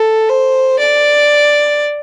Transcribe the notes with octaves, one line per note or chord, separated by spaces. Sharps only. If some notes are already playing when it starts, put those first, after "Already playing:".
Already playing: A4
C5
D5